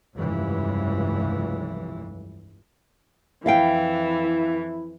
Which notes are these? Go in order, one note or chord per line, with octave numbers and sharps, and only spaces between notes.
F1 C#2 G2 E3
F2 E3 E4 E5 F5 G5